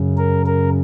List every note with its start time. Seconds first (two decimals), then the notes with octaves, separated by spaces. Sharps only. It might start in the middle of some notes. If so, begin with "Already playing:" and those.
Already playing: F#2 C#3
0.18 A#4
0.46 A#4